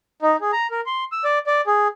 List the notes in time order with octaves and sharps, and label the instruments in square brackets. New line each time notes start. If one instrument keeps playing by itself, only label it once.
[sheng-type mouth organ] D#4
G#4
A#5
A#4
C6
E6
D5
D5
G#4